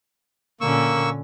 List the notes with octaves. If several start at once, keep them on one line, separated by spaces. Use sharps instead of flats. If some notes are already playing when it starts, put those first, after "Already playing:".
A#2 D3 A#3 C#4 C#6 E6